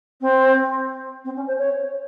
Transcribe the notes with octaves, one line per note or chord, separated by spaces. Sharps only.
C4
C4
C#4
C5
C#5